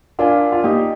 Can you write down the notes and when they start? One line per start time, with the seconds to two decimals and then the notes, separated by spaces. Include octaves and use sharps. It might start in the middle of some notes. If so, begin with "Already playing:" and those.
0.19 D4 F4 A#4 D5 F5 G#5
0.52 F4
0.64 A#3 D#4 G4